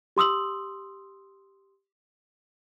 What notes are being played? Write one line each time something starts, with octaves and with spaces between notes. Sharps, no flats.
G4 C6 D#6 E6 F#7